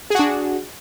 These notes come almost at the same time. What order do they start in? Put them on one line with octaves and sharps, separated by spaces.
G#4 F#4 D4